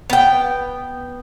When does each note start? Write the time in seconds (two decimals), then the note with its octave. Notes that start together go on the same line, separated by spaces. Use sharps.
0.10 B3 G5